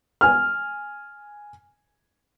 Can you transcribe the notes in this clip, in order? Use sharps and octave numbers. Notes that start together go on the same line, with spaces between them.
G#5 F6